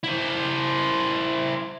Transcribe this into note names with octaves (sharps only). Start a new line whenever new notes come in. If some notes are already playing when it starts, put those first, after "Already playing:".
E4 C5